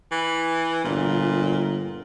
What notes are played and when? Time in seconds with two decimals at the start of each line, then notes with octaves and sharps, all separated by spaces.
0.11 E3
0.84 G1 A#2